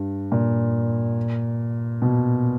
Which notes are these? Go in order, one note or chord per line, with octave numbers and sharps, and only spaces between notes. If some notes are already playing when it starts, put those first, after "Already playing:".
Already playing: G2
A#2
B2